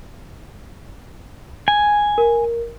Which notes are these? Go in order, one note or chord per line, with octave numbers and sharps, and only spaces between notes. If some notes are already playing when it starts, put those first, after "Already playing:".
G#5
A#4